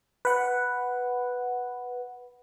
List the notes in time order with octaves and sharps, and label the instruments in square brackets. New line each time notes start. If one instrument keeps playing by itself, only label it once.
[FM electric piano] B4 F#5